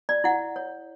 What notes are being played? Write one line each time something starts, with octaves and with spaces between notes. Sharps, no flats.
D5
E4 F#5
C#5